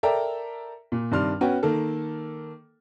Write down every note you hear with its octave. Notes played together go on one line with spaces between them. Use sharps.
A4 A#4 D5 E5 G5 A#5
A#2
G2 C3 D#3 D4 C6 F6
B3 C#4 F#4 B4 G5
D#3 A#3 A4